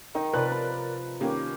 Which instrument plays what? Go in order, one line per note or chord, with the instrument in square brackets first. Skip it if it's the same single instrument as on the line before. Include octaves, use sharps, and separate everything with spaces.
[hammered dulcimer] D#3 [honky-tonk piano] D#4
[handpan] C3 B4 [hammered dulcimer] F3 [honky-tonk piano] A#4 D5 F#6
[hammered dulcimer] B5
[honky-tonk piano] D#3 A#3 C#4 [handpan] G4